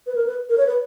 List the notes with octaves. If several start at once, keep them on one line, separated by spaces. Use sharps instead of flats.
B4
A#4
B4
A#4
C#5
B4